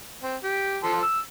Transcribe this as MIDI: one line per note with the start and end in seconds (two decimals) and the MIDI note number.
0.23 0.36 60
0.44 0.78 67
0.83 1.01 53
0.83 1.01 69
0.83 1.01 84
1.03 1.19 88